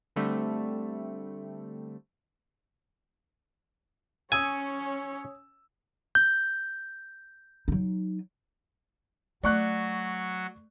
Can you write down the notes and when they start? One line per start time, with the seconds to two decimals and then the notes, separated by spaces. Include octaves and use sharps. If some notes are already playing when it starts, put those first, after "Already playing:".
0.16 D3 G3 A3 C4
4.32 C#4 C#5 G#5 D#6 E6
6.15 G6
7.68 F#3 D#4
9.43 F#3 A3 F#4 D5 C#6 F#6